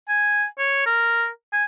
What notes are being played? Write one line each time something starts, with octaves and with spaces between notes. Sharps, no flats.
G#5
C#5
A#4
G#5